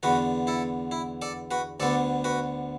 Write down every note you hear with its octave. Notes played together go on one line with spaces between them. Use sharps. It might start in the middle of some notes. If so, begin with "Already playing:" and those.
E2 D3 B3 F#4 B4
E4 A4
E4
A4 D5
F#4 B4
D2 D3 B3 A4 D5
F#4 B4